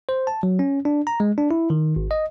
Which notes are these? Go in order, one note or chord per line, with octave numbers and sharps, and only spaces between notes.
C5
A5
F#3
C#4
D4
A#5
G#3
D4
E4
D#3
G#1
D#5